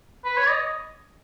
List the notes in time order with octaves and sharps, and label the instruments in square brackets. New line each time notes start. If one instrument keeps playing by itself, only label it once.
[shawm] B4
C#5
D#5